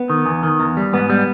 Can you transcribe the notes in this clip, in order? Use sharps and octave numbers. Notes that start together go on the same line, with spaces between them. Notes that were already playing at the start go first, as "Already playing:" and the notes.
Already playing: B3
D#3
E2
D#3
E2
G3
G#2 B3
G3